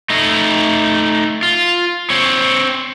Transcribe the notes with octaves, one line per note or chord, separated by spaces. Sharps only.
A3 D#4
F4
C4 C#5